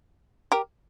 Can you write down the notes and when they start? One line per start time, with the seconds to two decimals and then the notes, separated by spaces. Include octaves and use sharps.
0.52 G4 A#4